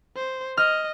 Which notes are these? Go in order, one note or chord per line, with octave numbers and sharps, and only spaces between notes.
C5
D#5 F6